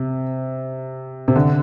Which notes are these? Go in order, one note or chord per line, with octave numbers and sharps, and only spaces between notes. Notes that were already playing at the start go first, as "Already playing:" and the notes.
Already playing: C3
C3
D3